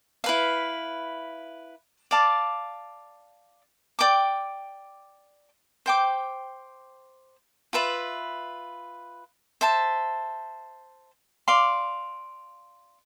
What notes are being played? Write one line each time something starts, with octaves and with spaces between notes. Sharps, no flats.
E4 B4 F5
D5 F5 A5 D6
D5 G5 D6
C5 G5 D6
F4 B4 E5 B5
C5 E5 A5
D5 F5 C6